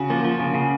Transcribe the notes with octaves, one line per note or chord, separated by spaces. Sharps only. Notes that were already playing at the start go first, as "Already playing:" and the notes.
Already playing: C#3 F#4
F3 A#3
F3
C#3 A#3
C#3